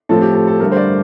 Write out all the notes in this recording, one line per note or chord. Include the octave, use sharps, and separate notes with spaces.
A2 F3 C4 A4
G4
A4
A4
G2 D3 A3 A#4
C5
D5